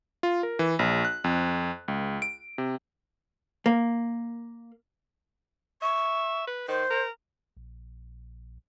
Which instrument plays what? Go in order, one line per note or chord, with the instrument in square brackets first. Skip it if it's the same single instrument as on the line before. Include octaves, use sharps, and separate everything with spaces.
[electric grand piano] F4
A#4
E3
A#1
F#6
F2
C#2
D7
C3
[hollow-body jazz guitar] A#3
[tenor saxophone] E5 [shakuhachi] C#6
[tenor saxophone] B4
[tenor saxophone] D#3 [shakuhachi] C5
[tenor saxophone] A#4
[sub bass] A#1